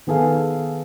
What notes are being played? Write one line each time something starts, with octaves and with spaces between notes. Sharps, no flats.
D#3 B3 G#4 A4 F5